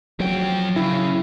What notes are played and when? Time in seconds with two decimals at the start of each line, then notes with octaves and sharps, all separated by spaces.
0.20 F3 F#3 G5
0.76 C#3 E4